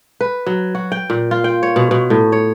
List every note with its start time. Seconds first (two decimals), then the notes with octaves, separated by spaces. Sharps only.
0.21 B4
0.46 F#3
0.75 F#4
0.92 G5
1.10 A#2
1.31 F4
1.44 G5
1.63 C#5
1.76 B2
1.91 B2
2.10 A2
2.32 C#5